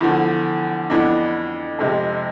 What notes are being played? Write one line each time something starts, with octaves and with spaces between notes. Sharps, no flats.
E2 D3 F3
F2 E3 B3 D4
F2 C3 F3 G#3